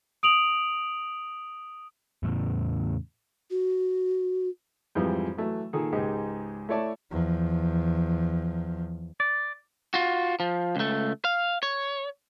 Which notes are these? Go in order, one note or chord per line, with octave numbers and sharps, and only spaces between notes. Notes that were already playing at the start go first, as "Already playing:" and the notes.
D#6 D7 F7 F#7
E2 A2 C#3
F#4
F2 G#2 E3 F3 G3
E3 F#3 A3
A#2 D#3 G#4 A4
C#2 G#2 G#3 D#4 G4
A3 E4 C#5 D5 A5
E2 F3
D5
F4 F#4
F3
C#2 A3
F5
C#5